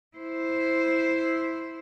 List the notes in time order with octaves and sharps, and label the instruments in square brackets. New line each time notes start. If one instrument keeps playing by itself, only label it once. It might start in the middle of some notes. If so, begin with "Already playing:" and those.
[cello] E4 C5